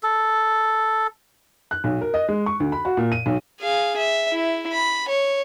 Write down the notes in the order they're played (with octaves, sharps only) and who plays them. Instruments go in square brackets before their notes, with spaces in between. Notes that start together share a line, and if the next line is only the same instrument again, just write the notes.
[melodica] A4
[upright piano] F#6
B1
A#4
D#5
G#3
C#6
D2
B5
F#4
A#2
D#7
B1
[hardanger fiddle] G#4 F5
E5
E4
B5
C#5